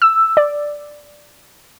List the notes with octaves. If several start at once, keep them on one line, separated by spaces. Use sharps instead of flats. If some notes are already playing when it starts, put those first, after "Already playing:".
E6
D5